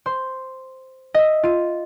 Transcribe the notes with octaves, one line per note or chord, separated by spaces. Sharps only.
C5 C6
D#5 E5
F4 D#7